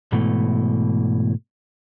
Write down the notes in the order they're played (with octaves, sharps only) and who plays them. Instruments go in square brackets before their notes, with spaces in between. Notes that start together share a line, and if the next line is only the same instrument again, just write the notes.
[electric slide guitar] G#2 B2 E3 A3